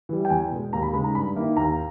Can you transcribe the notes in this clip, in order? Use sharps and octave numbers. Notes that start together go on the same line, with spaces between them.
E3 G3
G5
E2 G#5
B2 G#3
D#2 A#5
B5
C#3 G#3 D#4 B5
A#5
G2 B5
D#3 A#3 E4
D#2 A#5